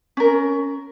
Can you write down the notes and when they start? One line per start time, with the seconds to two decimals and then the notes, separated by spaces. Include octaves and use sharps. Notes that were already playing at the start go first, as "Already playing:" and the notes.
0.17 C#4 A#4